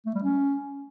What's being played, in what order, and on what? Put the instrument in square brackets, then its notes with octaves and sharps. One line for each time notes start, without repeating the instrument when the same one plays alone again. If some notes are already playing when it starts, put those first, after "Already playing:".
[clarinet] A3
G3
C#4